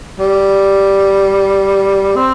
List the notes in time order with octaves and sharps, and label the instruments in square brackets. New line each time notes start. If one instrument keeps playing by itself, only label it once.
[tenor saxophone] G3
C4